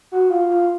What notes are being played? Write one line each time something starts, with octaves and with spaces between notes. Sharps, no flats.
F#4
F4
F4